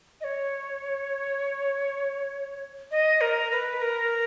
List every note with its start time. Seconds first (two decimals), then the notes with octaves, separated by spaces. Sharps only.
0.21 D#5
0.24 C#5
2.91 D#5
3.21 A#4
3.52 B4
3.82 A#4